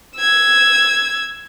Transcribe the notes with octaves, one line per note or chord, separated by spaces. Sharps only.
E6 G#6